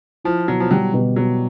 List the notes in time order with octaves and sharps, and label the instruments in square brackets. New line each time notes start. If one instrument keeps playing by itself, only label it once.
[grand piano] F3 [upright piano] E4
[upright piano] B2 [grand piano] F#3
[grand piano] F3
[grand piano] F#3 [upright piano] G3
[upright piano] B2
[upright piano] B2 [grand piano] F#3